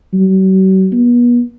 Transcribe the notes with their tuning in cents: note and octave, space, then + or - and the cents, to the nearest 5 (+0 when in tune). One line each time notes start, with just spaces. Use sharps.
F#3 +45
B3 -35